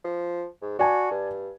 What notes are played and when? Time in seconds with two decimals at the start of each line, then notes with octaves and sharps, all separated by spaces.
0.04 F3
0.62 G#2
0.79 F#4 D5 G#5 A5
1.11 G2